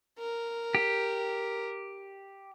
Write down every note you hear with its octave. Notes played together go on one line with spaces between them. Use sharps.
A#4
G4